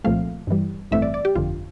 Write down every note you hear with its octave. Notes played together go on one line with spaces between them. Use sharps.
C2 A#2 F3 A3 C4 F5
G2 E3 G3
A1 G2 E3 A3 C4 E5
D5
D5
G4
G1 F2 D3 F4